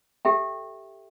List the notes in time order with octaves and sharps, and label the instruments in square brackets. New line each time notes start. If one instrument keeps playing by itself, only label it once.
[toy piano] G4 A4 E5 G5